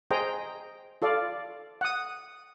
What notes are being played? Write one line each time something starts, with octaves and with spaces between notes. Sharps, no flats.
G#4 C5 D#5 G5 A#5
F4 A4 D5 F5
F#5 D#6